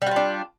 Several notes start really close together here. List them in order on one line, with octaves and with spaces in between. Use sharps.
G3 F#4 F4 D4